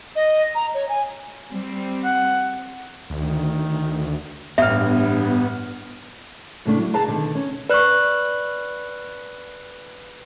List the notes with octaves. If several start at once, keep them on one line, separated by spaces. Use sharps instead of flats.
D#5
A#5
C#5
G#5
G3 C4
F#5
D2 D#3
A1 G2 B3 E5 F6
A2 C#3 A3 D4
F#3
G#4 B4 F5 A5 A#5
B2 D3 D#3
C#4
B4 D5 C#6 F#6